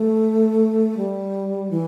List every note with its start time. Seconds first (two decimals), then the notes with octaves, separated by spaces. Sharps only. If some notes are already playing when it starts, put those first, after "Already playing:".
Already playing: A3
0.97 G3
1.71 E3